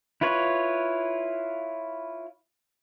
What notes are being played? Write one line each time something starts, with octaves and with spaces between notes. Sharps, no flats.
E4 F4 B4 C#5